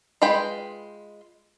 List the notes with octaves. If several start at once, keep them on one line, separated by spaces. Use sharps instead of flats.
G#3 F4 B4 G5